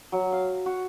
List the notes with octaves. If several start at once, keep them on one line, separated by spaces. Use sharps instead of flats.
F#3
F5
F#4